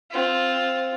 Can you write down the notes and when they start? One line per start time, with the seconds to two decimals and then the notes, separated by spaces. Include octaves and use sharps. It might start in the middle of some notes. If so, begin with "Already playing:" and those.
0.11 C4 F4